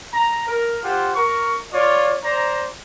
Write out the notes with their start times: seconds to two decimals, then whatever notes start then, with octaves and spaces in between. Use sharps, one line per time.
0.14 A#5
0.48 A#4
0.83 F4 G4 C5 F#5
1.16 A#4 C#6
1.72 F4 C#5 D5
2.24 C5 D5 A#5